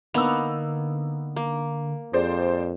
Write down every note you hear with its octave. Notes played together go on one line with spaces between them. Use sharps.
D3 A#3 B3 D#4 E6 F7
A#3
F2 G#4 C5 D5